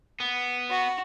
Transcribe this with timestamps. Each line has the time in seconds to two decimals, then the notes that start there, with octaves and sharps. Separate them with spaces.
0.20 B3
0.70 F#4